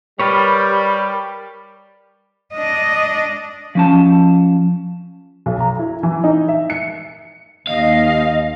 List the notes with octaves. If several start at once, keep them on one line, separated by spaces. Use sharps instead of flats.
G3 A#4 B4 C#5
D4 D#5
F3 C#4 A5
B1
A#5
E4
E3
D#4
E5
C#7
D#2 D#5 F5